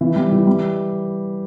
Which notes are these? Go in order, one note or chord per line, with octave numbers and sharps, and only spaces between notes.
E3
G3
E3
G3